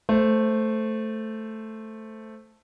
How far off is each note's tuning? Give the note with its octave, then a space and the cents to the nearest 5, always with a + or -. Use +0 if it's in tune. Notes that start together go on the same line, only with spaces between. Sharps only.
A3 +0 C5 +0